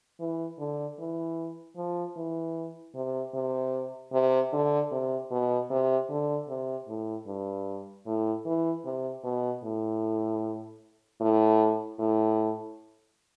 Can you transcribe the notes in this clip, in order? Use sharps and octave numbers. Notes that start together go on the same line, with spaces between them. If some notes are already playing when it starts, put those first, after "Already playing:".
E3
D3
E3
F3
E3
C3
C3
C3
D3
C3
B2
C3
D3
C3
A2
G2
A2
E3
C3
B2
A2
A2
A2